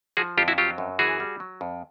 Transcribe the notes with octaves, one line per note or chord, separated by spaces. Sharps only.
F3 F#4 G#4
F2 F4 G4
E4 F#4
F#3 F4 G4
F#2
E3 F#4 G#4
G3
F#3
F2